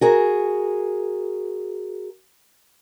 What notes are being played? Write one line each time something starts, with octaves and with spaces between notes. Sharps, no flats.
F#4 G#4 A#4